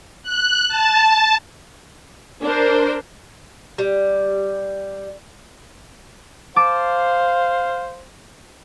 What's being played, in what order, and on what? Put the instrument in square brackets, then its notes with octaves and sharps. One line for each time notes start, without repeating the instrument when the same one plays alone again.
[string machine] F#6
A5
[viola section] D4 A#4 C5
[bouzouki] G3
[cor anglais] C5 [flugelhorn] F5 [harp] A5 D6